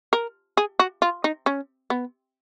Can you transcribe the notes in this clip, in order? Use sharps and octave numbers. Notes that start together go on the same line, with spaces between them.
A#4
G#4
F#4
F4
D#4
C#4
B3